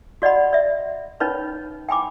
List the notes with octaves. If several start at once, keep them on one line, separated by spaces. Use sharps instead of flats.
F#4 D5 D#5 F#5 B5
D5 E5
C#4 D#4 B4 C#5 B5
G5 G#5 B5 D6